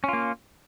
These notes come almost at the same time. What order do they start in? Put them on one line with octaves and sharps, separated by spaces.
C#4 F4 A#3